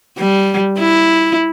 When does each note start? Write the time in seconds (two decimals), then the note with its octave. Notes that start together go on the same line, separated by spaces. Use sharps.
0.17 G3
0.79 E4